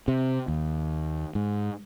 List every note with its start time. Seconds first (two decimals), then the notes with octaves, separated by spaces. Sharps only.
0.08 C3
0.48 D#2
1.35 G#2